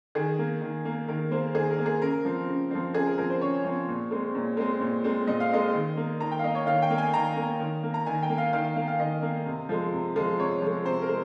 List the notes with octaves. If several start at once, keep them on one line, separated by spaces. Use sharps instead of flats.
D#3 G#4
A#3
D#3
A#3
D#3 A#4
A#3 C5
D#3 G#4
A#4
A#3
G#4
C#3 A#4
F3 C4
C#3
F3 C4
C#3 G#4
A#4
F3 C4 A#4
C5
C#3 C#5
F3 C4
A#2
G#3 C4
A#2
G#3 C4
A#2
G#3 C4
A#2 D#5
F5
G#3 C4 D#5
D#3
A#3
D#3 A#5
G5
F5
A#3 D#5
C#5
D#3 F5
G5
A#3
G#5
D#3 A#5
A#3
D#3
A#3
A#5
D#3 G#5
G5
A#3
F5
D#3 F5
F5
A#3 F5
F5
D#3 D#5
A#3
C3
F3 G#3
C3
F3 G#3
C3 C#5
F3 G#3
C3 C5
A#4
G#3